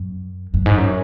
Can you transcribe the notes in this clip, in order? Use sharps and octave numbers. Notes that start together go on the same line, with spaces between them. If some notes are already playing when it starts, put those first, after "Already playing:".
Already playing: F#2
F#2
G#2
F#2